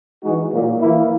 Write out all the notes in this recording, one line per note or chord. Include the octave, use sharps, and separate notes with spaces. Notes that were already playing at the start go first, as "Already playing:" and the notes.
E3 G#3 D#4 F#4
A#2 F#3 A#3
E3 A#3 E4